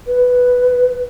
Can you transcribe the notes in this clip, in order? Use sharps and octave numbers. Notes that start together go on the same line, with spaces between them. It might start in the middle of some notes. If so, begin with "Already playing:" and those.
B4